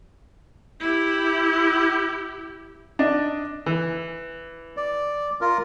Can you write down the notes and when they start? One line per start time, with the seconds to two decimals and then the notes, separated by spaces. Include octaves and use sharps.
0.80 E4 G4
2.99 D4 D5 D#5
3.66 E3
4.77 D5
5.41 F4 A#4